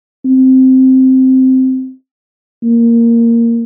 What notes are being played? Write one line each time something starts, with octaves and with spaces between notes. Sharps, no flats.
C4
A#3